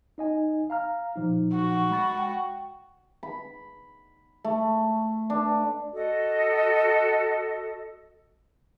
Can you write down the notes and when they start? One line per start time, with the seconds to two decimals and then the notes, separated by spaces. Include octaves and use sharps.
0.18 D#4 D#5 G#5
0.70 F5 A#5 F6
1.16 A#2 F3 D#4
1.54 F#4
1.91 G#3 B5 A6
2.19 G5
3.23 B5
4.44 A3
5.30 D4
5.94 F#4 A4 D#5 D#6